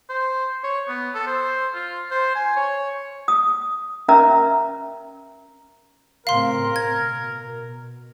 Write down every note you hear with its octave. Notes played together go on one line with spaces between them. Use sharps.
C5
C#5
B3
A4
C5
F4
C5
G#5
C#5
D#6
C#4 A#4 B4 E5 A#5
A2 C#3 C4 A#4 F5 C6
B2 G#6